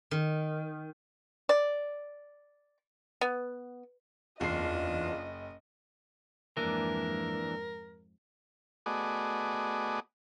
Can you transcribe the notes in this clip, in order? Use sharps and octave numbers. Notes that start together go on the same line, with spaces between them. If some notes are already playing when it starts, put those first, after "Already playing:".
D#3
D5
B3
F#1 E2 D4 F4 D#5 C7
F2 G#2 E3 A#3 D4 A#4
A3 B3 F#4 G#4 D5 D#5